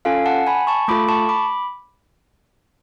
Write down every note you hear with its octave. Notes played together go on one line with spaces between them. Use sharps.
C#4 F4 A4 F5 G#5
F#5 A5
G#5 B5
A5 C#6
A3 F4 A4 B5 D6
A5 C#6
B5 D6